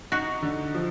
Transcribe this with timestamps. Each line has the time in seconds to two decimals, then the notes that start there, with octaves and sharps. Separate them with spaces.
0.12 D#4 F#4
0.42 D3
0.75 F3